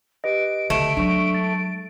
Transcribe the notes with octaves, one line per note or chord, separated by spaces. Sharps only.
G4 B4 D#5 D7
C#2 D3 A3
F#3 G#3 D4 C#6
A6